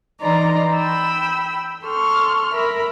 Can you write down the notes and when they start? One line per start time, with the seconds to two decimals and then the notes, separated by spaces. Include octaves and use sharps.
0.20 E3 D#4 D5 A#5 C6
0.72 G5 B5 E6
1.84 A4 C6 C#6 F6
2.55 A#4 E5 B5